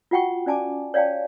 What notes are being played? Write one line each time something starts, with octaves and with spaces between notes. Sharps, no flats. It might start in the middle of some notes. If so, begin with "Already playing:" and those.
F4 F#4 F#5 G5 C#6
C#4 D5 G#5 A5 D6
C#5 D5 F5 G5 A5